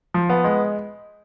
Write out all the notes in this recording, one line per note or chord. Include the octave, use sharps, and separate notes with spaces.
F3
B3
G#3